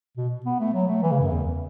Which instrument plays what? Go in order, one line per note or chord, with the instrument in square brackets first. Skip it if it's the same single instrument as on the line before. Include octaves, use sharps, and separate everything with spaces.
[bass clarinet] B2
B3
A3
F#3
A3
E3
C#3
F#2
E2